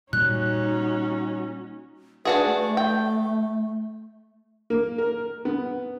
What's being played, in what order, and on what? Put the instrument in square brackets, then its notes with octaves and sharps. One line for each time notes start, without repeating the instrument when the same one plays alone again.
[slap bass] A#2 G3 [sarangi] C#4 [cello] D#4 F#4 [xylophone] F#6
[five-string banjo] D4 F#4 G#4 [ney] B4
[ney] A3
[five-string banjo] G5
[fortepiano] A#3
A#4
B3